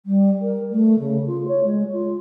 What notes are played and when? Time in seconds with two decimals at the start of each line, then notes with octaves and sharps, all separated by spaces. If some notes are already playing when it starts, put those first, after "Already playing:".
0.06 G3
0.41 A#4
0.71 A3
0.99 C#3
1.26 F4
1.48 C#5
1.64 G#3
1.92 F4